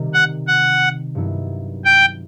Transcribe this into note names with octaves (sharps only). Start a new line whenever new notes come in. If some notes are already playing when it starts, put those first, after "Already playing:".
Already playing: C3 D#3 G3
F#5
F#5
G2 D#3 F#3 B3 E4
G5